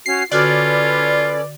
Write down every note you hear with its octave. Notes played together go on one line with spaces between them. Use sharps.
C#4 F#4 C7
D3 C#4 F4 F#4 A4 B4 D5 F6